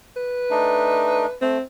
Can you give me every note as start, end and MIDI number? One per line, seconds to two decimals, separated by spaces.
0.16 1.34 71
0.51 1.26 57
0.51 1.26 62
0.51 1.26 63
1.42 1.58 57
1.42 1.62 60